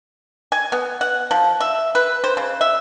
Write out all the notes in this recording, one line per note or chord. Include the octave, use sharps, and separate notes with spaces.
G#5
B3
F#5
F3
E5
B4
C5
C#3
E5